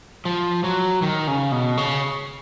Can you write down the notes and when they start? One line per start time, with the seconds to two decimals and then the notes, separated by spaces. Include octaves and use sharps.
0.25 F3
0.64 F#3
1.02 D#3
1.27 C#3
1.52 B2
1.77 C#3